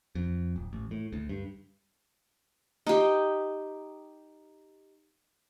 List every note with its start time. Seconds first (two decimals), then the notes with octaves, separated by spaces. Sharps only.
0.15 F2
0.56 D1
0.73 A1
0.91 A2
1.12 D2
1.29 G2
2.87 D#4 G4